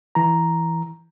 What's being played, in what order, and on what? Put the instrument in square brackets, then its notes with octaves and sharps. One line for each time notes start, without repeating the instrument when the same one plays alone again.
[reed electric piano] E3 A#5